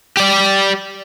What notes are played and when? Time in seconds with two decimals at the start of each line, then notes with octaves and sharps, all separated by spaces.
0.17 G4 D5